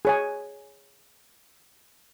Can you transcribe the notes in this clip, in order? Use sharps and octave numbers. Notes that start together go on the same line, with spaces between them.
G#4 C#5 G#5